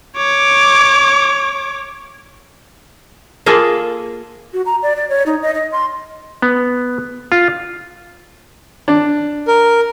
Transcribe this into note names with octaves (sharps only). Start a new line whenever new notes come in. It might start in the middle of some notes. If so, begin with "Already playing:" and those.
C#5 D6
A#3 F4 G#4 A4
F#4
A#5
D5
D5
C#5
D#4
D#5
D#5
C6
B3
F4
D4
A#4